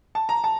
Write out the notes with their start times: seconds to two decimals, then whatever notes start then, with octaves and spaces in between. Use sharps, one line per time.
0.15 A5
0.29 A#5
0.44 A5